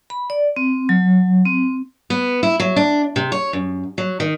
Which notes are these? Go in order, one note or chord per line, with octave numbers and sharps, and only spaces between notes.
B5
D5
C4
F#3
C4
B3
E4
F#3
D4
C3
C#5
F#2
F#3
D#3